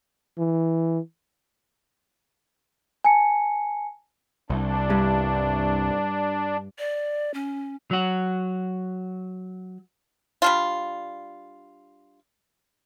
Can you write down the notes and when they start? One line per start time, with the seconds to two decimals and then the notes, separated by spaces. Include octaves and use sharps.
0.38 E3
3.04 G#5 A5 C#7
4.50 C2 D4
4.90 G2
6.79 D5
7.34 C#4
7.91 F#3 F#4
10.42 G3 D4 F4